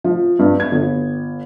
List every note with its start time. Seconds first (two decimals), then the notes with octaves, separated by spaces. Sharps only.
0.04 F3
0.39 G2
0.60 G#6
0.72 G1